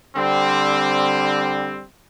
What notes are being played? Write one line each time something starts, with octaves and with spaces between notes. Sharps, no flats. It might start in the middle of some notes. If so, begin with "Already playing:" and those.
D3 G3 C4